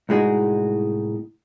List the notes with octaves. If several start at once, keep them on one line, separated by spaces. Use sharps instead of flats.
C2 A2 G#3 D#4 F#4